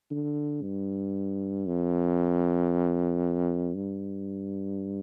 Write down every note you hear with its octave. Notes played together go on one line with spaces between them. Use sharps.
D3
G2
F2
G2